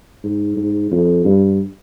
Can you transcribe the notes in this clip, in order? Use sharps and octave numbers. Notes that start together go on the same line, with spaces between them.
G#2
G#2
F2
G2